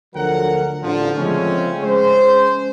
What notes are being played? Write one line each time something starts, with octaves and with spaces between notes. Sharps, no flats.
D2 D3 F3 F#3 A#4 F#5
A1 D3 F3
C#3 F3 G#3 A3 C4 C#4
G#3 C#4 G#4 C5